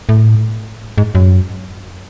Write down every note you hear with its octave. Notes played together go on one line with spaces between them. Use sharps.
A2
G#2
F#2